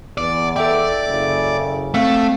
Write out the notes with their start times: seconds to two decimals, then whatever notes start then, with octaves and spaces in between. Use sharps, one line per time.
0.18 E2 D5
0.56 A4 D5 E5 G5
1.07 F#1 C#3
1.94 A3 C4 F5 B6